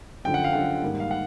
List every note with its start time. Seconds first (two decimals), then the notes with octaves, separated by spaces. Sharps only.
0.24 F#2 D3 F3 G5
0.34 F#5
0.44 F5
0.53 F#2 D3 F3 F#5
0.82 G#2 D#3 G3 A#3
1.00 F5
1.11 F#5